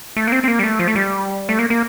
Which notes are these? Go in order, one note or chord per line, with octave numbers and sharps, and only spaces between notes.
A3
A#3
C4
C4
A#3
G3
A3
F3
A3
G3
A3
A#3
A#3